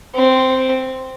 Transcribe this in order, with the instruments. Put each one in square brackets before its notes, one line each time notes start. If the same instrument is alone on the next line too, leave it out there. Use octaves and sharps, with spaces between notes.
[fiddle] C4